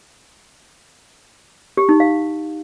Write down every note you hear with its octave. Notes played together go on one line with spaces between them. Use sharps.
G4
D#4
F5